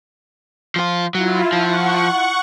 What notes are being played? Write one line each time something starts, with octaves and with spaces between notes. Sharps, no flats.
F3 F4
F#3 E4 F4
F3 F#5 C#6